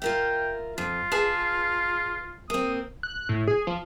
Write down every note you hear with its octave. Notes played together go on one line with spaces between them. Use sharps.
F4 A#4 E5 G5
F2 F4
G#4 B4 A5
A#3 C4 D#6
F#6
A2
G#4
F3